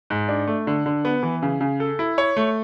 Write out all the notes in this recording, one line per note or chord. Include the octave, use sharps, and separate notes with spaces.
G#2
D4
A3
D3
D3
B3
E3
C#3
C#3
A4
E4
C#5
A3